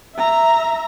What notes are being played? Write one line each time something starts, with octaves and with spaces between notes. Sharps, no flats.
E5 A#5